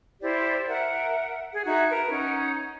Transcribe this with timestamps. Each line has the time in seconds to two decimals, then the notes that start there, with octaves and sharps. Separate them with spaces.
0.22 E4 G4 C5 D5
0.68 A#4 E5 F#5
1.53 G#4
1.65 D#4 F#4 E5
1.89 A#4 B4 A5
2.10 C#4 D#4 F#5